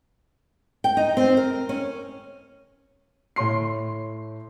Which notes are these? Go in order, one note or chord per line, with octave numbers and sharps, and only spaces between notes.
G5
D#4
C4
A#4
C#4
A2 C#5 C6 C7